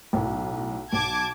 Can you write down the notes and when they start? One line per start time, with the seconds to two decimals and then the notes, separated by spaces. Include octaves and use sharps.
0.13 B1 A2
0.93 B1 A5 D6 G#6